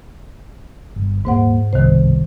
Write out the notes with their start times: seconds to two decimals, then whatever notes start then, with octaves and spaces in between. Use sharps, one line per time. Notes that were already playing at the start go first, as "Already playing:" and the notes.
0.96 G1
1.25 D#1 G#2 A#3 C5 F#5
1.73 G1 C2 B2 D#3 C5